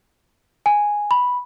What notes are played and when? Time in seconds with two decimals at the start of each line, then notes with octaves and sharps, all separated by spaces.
0.66 G#5
1.11 B5